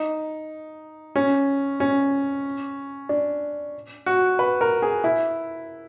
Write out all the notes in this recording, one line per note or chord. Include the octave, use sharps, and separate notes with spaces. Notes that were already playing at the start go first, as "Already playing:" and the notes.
Already playing: D#4
C#4
C#4
D4
F#4
B4
A#4
G#4
E4